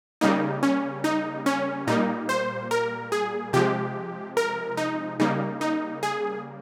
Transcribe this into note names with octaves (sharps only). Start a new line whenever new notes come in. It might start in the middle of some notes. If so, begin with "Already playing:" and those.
C#3 G3 A#3 D#4
C#4
D#4
C#4
A#2 G3 A#3 D#4
C5
A#4
G#4
C3 F3 G#3 G4
A#4
D#4
C#3 G3 A#3 D#4
D#4
G#4